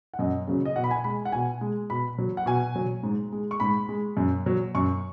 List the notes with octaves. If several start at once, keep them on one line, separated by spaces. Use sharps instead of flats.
F#5
F#2 D#5
C#3 F#3
D#5
B2 F#5
B5
G#5
G#3 B5
F#5
B2 G#5
G#3
B2 B5
F#3
F#5
B2 G#5
F#3
G#2
G#3
C#6
G#2 B5
G#3
F#2
F#3
F#2 C#6